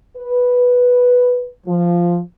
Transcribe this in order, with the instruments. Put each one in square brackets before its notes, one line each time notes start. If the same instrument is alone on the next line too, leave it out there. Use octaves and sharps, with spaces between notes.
[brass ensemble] B4
F3